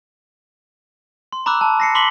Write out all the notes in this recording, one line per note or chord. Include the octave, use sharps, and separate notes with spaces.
C6
A#5 B5 D6 E6 F#6
A5
A#6 C7 C#7
B5 C6 D6 B6 F#7 G7